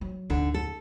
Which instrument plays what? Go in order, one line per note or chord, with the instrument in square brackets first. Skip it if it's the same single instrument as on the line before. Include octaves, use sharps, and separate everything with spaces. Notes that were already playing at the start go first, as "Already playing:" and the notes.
[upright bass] F#3
[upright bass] D2 G#2 [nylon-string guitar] D3
[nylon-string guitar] A4